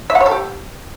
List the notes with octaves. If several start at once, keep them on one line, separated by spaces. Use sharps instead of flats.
E5
F#5
C#5
A4
G4